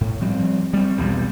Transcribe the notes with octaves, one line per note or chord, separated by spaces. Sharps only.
A2
F3 G3 C4
G3 C4
B1 E2 G3